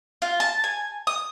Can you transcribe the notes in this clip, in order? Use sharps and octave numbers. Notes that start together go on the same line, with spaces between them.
F4
A5
G#5
D#6